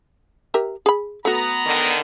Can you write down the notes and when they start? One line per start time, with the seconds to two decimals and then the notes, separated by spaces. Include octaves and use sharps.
0.54 G4 A#4 E5
0.86 G#4 B5
1.25 A3 B3 F#4 A#5
1.67 D3 D#3